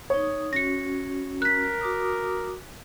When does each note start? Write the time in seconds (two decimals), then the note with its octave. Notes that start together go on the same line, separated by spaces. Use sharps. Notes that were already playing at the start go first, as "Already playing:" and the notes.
0.10 D#4 C#5 D#6
0.53 C#4 F#4 A#6 C#7
1.42 A#4 F#6 B6
1.81 F#4 D6 D#6